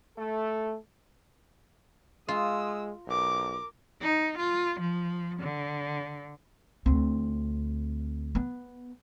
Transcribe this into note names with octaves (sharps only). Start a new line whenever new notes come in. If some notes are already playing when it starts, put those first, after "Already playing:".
A3 A4
G#3 F4 D#6 E6
B1 A#4 D6
D#4
F4
F3
D3
D2 C4
B3